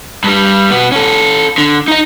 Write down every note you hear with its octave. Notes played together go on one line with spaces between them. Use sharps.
G2 G3
B2 B3
C#4 A4
D3
D#4 D#5